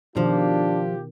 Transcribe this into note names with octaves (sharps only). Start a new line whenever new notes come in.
B2 D#3 F3 D4 F4 G4